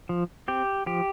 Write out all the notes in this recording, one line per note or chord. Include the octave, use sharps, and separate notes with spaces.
F3
C4 G4
F3 G4